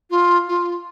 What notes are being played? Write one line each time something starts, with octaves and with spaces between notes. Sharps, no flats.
F4
F4